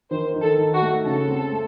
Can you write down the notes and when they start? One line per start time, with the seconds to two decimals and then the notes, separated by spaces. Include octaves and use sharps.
0.11 D#3 C5
0.34 D#3
0.42 A4
0.59 D#4
0.73 F#4
0.82 A3
1.05 C#3 A4
1.28 C4
1.51 A3